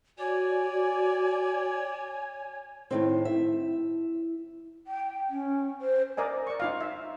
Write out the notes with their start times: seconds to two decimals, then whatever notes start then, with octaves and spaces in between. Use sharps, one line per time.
0.18 F#4 C#5 D5 G#5
2.91 A2 D#3 C4 E4
3.25 E5
4.87 G5
5.29 C#4
5.81 C5
6.17 A#4 D5 D#5 G#5
6.47 D5 C#6
6.60 D#4 F4 F5
6.81 E5